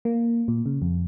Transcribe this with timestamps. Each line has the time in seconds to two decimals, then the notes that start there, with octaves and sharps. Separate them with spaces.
0.05 A#3
0.48 A#2
0.66 C#3
0.82 F2